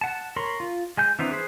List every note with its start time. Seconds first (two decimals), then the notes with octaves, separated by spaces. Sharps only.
0.01 F#5 A5
0.36 A#4 C#5 B5 C6
0.60 F4
0.97 G#3 G#5 G6
1.19 E3 B3 C4 D4 D#4
1.31 G#4 B4 C5